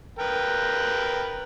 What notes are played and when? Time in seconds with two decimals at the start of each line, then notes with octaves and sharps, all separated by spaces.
0.19 A#4 B4 G5